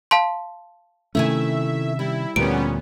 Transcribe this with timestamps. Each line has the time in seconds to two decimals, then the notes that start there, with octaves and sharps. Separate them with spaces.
0.11 F5 A5 C6
1.15 C3 D#3 A3 C#4 E4 E5 G#5
1.99 G3 E4
2.36 D2 A#2 G3 B3 C#4 D7